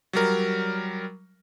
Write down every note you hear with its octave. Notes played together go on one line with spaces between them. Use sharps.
F#3 G3 A#4